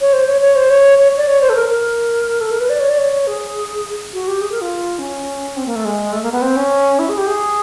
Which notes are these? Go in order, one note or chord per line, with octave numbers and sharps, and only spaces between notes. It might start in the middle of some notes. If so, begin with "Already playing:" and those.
C#5
C5
C#5
C#5
C5
C#5
C#5
D5
C#5
C5
A4
A#4
A#4
A4
A#4
B4
D5
C#5
D5
C#5
G#4
F#4
G4
G#4
A#4
F4
C#4
C4
A#3
A3
G#3
A3
A#3
B3
C4
C#4
E4
G#4
G4
G#4